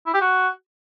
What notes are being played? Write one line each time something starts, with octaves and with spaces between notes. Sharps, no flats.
E4
G4
F#4